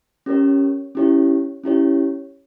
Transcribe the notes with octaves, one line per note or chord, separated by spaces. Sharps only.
C#4 G4 A#4 C#5
C#4 E4 G4 C#5
C#4 E4 G4 C#5